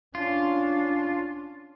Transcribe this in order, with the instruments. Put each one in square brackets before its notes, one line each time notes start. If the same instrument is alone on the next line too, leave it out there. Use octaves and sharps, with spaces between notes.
[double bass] C#4 D4 [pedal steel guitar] F4